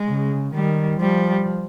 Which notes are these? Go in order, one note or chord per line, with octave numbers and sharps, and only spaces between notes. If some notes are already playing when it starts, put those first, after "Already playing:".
Already playing: G#3
C#3
D#3 G3
F3 G3